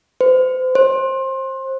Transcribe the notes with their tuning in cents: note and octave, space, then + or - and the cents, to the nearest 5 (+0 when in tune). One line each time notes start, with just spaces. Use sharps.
C5 -40
C5 +25